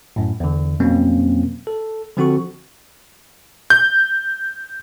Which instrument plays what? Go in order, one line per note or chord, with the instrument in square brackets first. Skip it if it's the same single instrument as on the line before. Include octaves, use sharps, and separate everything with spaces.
[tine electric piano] F#2 A2
E2 D3
F2 B2 F#3 A#3 C4 C#4
A4
D3 F3 C4 F#4 A4 C#6
[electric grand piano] G6